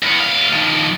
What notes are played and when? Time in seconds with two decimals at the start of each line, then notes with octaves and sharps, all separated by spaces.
0.03 E2 B3
0.20 D2 F5
0.53 D#3 F3